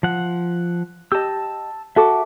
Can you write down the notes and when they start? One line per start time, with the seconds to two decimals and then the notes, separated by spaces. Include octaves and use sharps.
0.03 F3 F#5
1.12 G4 D#5 A5 E6
1.96 F#4 A4 E5 D6